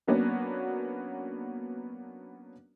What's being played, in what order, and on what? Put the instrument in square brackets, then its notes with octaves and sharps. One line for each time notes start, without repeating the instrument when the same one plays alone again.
[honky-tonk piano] F#3 A#3 B3 C#4 D4 F#4